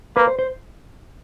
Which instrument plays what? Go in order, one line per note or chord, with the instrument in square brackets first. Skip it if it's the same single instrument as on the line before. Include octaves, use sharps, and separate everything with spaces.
[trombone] A#3 [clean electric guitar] B4
[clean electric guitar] C5
C5